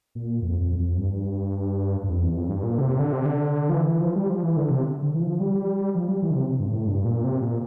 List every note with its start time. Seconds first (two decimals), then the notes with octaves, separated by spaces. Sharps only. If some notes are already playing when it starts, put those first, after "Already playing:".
0.15 A#2
0.42 F2
0.61 F2
0.79 F2
0.97 G2
2.04 G2
2.09 F2
2.22 E2
2.36 F2
2.49 G2
2.64 A#2
2.78 D3
2.81 C3
2.99 D3
3.12 C3
3.25 D3
3.69 F3
3.74 E3
3.88 E3
4.01 F3
4.16 G3
4.29 F3
4.43 E3
4.57 D3
4.70 C3
5.02 D3
5.14 E3
5.21 F3
5.40 G3
5.95 F3
6.08 G3
6.22 E3
6.30 D3
6.35 C3
6.50 C3
6.60 G2
6.68 A2
6.87 G2
7.05 A#2
7.24 C3
7.42 A#2